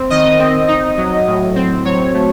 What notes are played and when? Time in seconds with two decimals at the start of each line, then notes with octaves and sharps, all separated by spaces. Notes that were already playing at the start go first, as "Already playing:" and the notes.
Already playing: C4
0.10 D#3 D#5
0.39 C4
0.68 D#4
0.97 F#3
1.27 A2
1.56 C4
1.85 F#3 C#5
2.14 A3